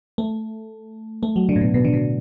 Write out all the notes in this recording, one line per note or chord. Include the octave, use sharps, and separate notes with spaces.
A3
A3
F#3
D3
A2
B2
B2
D3
B2